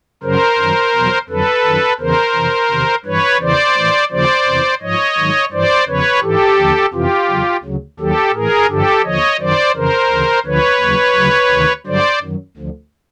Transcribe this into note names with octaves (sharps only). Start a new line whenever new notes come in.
F#2 C#3 F#3 A#4 C5
F#2 D#3 F#3
E2 B2 F#3
F2 D3 F#3 A4 B4
F#2 D#3 F#3
E2 C#3 E3 A#4 C5
F2 C3 E3
E2 C3 D#3
G2 E3 B4 C#5
E2 C#3 E3 C5 D5
A2 E3
D#2 C#3 F3 C5 D5
E2 C3 E3
G#2 F3 C#5 D#5
G#2 D#3 F#3
G2 E3 C5 D5
E2 C#3 F3 B4 C#5
G#2 E3 G4 A4
D#2 D3 F3
F2 C3 E3 F4 G4
E2 C#3 F#3
D2 C#3 F#3
D#2 D#3 F#3 G4 A4
A2 E3 G#4 A#4
G2 D3 F3 G4 A4
D#2 D3 F3 C#5 D#5
F#2 D#3 F#3 C5 D5
F2 C#3 E3 A#4 C5
D2 C#3 E3
D2 D3 F3 B4 C#5
D#2 C#3 F#3
D2 C#3 F#3
D2 C3 D#3
G2 D3 F#3 C5 D5
F#2 D#3 F#3
D2 D3 F3